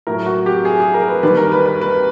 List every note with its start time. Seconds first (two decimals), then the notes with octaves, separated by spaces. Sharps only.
0.07 A2 F#3 A#4
0.26 F#4
0.46 G4
0.65 G#4
0.80 G#4
0.94 A#4
1.08 B4
1.23 D#2 D#3 G3 B4
1.37 A#4
1.52 B4
1.66 B4
1.81 B4